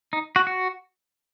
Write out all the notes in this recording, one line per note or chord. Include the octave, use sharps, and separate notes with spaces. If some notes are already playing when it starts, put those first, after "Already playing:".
D#4
F#4
F#4